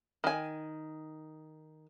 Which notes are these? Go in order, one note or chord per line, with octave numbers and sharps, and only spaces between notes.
D#3 G#5